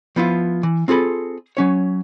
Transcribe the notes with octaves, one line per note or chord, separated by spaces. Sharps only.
F3 B3 E4 F4
E3
C4 F4 G#4 A4 B5
F#3 C#4 C#5